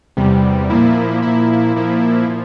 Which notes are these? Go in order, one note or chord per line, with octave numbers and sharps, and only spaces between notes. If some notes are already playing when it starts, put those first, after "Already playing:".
E2 C3 G3
A#2 F3 A#3 E4
A#2 F3 A#3 E4
A#2 F3 A#3 E4
A#2 F3